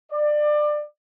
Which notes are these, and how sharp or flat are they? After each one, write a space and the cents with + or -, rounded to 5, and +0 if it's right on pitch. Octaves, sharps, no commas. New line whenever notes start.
D5 +25